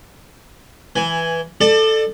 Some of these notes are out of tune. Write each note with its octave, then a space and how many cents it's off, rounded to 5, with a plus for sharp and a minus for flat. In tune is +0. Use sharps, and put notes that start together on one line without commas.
E3 +0 G#5 +0
A4 +0 D5 +35 A5 +0